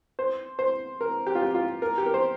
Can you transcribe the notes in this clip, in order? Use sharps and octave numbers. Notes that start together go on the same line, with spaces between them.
C5
C5
A#4
G4
F4
G4
F4
A#4
G4
A#4
C5